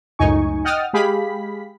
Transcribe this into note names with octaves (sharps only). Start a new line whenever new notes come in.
C#2 F#2 A2 D#4 G#5 C#6
D#5 F#5 G5 D#6 F6 A6
G#3 G4 G#4 F5 B5 B6